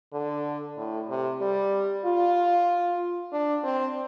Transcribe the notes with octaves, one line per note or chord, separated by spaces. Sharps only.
D3
A2
C3
G3
F4
D4
C4